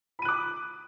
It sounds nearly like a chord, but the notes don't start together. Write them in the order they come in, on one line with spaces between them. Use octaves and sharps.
B5 D#7 F#6 D6